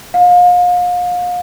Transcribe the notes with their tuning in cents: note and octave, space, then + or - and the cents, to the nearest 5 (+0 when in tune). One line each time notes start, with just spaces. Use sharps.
F5 +35